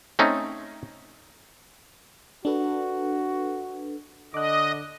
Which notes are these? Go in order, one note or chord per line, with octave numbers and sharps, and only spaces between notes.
A3 C4 C#4 D#4
D4 F#4 A4 B4
D3 D#5 D6 F#6